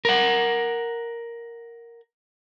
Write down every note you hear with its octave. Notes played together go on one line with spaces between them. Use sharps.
A#4 F#5